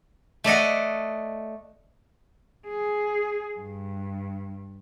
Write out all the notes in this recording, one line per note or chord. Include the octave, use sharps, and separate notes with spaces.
A3 D5 D#5 F#5
G#4
G2